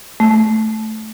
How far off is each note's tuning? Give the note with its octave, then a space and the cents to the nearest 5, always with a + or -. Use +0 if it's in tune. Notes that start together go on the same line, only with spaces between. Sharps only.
A3 -10